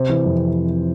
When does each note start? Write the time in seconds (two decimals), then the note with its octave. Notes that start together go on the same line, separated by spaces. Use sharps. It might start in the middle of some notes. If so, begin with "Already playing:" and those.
Already playing: C3 C5
0.09 E3
0.25 F2